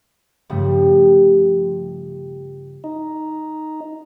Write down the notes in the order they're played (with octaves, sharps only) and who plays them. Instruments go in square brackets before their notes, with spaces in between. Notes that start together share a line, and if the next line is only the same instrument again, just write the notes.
[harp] G2 C#3 F3 G3 A3
[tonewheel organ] D#4